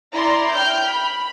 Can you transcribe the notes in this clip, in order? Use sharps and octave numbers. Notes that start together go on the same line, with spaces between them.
E4 D5 A#5 C6
G5 F6 G6
B5